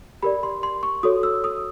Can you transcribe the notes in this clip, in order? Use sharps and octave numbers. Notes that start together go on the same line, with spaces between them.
G4 A#4 D5 B5
C6
C6
C#6
F#4 A4 C#5 D#6
E6
D#6